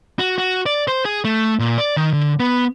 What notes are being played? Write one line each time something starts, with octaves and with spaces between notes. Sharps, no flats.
F#4
F#4
D5
C5
G#4
A3
A#2
D5
D#3
D3
B3